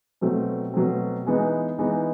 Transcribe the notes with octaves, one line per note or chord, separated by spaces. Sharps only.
B2 F#3 A3 C4
B2 F#3 A3 C4
E3 G#3 B3 D#4
E3 G#3 B3 D#4